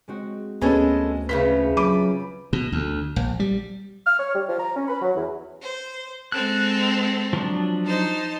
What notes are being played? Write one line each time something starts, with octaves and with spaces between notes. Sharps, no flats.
G#3 C4 F#4
D2 G#3 B3 C#4 A4 G#5 A5 B5
C#3 F3 C#4 B4 C5 E5 B6
F#3 B5 D6 D#7
B2
D2
A#1
G3
F6
C#5
G3
F3
A#5
C#4
B5
F#3
E2
C5
G#3 C4 A4 F#6
F3 F#3 D4
D#4 C5 A5